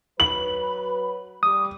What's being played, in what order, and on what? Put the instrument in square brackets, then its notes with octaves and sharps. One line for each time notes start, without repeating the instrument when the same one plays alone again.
[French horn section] F#3 B4 [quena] B5 [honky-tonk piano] F#7
[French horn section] G3 [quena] D6 [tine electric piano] D#6